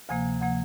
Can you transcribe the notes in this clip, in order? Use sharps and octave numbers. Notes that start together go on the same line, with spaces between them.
D2 C3 F3 A#3 G#5
C3 F3 A#3 F#5